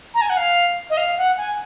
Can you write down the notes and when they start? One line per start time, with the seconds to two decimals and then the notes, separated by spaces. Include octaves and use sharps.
0.14 A#5
0.21 G#5
0.30 F#5
0.37 F5
0.90 D#5
0.97 F5
1.18 F#5
1.38 G#5